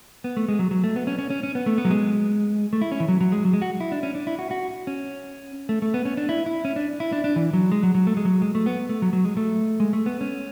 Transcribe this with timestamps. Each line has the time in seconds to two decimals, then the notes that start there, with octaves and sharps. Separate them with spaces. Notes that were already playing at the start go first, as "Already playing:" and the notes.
0.24 B3
0.37 A3
0.48 G#3
0.59 F#3
0.71 F#3
0.84 A3
0.96 B3
1.07 C#4
1.19 C#4
1.30 C#4
1.43 C#4
1.55 B3
1.66 A3
1.78 B3
1.85 F#3
1.91 G#3
2.73 A3
2.81 E4
2.92 C#4
3.00 E3
3.08 F#3
3.21 F#3
3.32 G#3
3.45 F#3
3.53 G#3
3.62 F#4
3.80 E4
3.92 D4
4.03 C#4
4.15 D4
4.27 E4
4.39 F#4
4.51 F#4
4.87 C#4
5.69 A3
5.82 A3
5.94 B3
6.05 C#4
6.17 D4
6.29 E4
6.46 E4
6.65 C#4
6.76 D4
7.00 E4
7.12 D4
7.24 D4
7.36 E3
7.53 F#3
7.72 G#3
7.83 F#3
7.95 F#3
8.07 A3
8.17 G#3
8.25 F#3
8.42 G#3
8.55 A3
8.66 B3
8.89 A3
9.02 F#3
9.13 F#3
9.25 G#3
9.37 A3
9.80 G#3
9.93 A3
10.06 B3
10.21 C#4